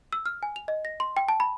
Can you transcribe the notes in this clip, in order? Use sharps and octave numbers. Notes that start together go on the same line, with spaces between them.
E6
F6
G#5
F7
D#5
A#6
C6
G5
A5
B5